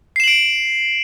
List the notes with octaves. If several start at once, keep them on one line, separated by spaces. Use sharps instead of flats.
C7 D7 E7 F#7